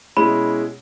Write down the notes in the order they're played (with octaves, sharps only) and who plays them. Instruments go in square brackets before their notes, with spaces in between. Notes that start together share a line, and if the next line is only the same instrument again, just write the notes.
[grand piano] B2 G#3 C#4 E4 [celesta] B5